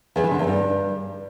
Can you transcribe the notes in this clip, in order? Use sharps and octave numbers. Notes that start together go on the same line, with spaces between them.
E2
E3
D3
E2
G2